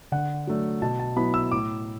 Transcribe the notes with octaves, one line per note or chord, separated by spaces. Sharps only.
D3 F#5
F#3 A3 D4
B2 A5
A5
F#3 B3 E4 B5
E6
A2 D6